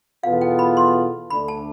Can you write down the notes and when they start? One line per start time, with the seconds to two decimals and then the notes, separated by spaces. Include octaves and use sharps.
0.23 E2 B2 B3 F4 A4 F5
0.41 G5
0.59 B5
0.77 C6
1.30 D2 D3 A3 D4 B5
1.48 A5